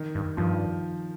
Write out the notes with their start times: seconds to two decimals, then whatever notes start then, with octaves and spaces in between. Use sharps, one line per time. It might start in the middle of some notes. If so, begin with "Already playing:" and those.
Already playing: D#3
0.15 G2
0.37 G2 F3